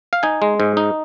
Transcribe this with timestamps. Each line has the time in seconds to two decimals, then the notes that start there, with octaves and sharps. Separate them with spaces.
0.13 F5
0.23 D#4 G#5
0.42 G#3
0.60 G#2
0.77 D#4